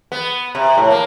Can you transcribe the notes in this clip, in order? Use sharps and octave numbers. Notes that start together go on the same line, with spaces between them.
B3
C3
A2
A#3